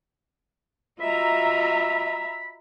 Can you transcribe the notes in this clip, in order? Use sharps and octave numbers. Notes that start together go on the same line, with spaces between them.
F4 F#4 D#5 E5 A#5 B5